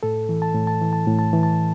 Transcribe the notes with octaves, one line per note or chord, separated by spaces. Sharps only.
A2 A4
E3
A5
A2
A5
E3
A5
A2
A5
E3
A5